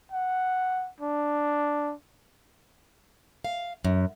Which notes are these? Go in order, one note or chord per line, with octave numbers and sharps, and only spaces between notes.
F#5
D4
F5
F#2